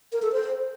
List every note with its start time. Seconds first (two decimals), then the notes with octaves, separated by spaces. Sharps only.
0.12 A#4
0.22 A4
0.32 C5